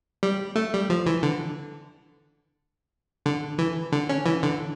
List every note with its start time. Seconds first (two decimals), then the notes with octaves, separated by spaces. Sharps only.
0.23 G3
0.56 A3
0.73 G3
0.90 F3
1.06 E3
1.23 D3
3.26 D3
3.58 E3
3.92 D3
4.09 C#4
4.26 E3
4.43 D3